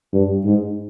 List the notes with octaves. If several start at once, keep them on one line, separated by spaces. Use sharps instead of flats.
G2
G#2